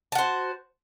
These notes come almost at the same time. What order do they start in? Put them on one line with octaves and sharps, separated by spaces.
A5 F#4 C5